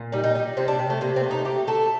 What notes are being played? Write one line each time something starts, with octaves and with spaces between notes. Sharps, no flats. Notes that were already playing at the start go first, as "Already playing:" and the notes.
Already playing: A#2
G3 D#4
D#4
G3 D#4
C3 C4
D4
C3
A3
C3 A#3
C4
A3
D#4
A3 G4
A3 A4